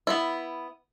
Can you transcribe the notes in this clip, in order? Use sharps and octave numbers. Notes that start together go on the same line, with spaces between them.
B3 E4